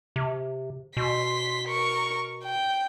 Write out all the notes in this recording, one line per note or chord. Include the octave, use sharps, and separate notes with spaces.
C3
B2 C6 B6
A#4 C#6
G5